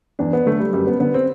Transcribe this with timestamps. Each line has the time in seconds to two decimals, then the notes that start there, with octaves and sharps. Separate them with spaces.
0.19 E2 D4
0.33 B3
0.46 D3 A3
0.60 G3
0.73 F#2 G3
0.87 B3
1.00 D3 B3
1.14 C4